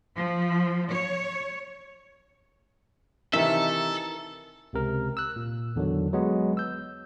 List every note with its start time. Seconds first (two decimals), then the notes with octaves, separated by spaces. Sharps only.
0.15 F3
0.91 C#5
3.33 C3 D#3 E3 D#4 E4 A4 A#4 E5
4.73 C#2 C3 A#4
5.17 E6 F#6
5.36 A#2
5.76 E2 D3 D#3 F#3
6.13 F#3 G#3 B3
6.57 E6 G6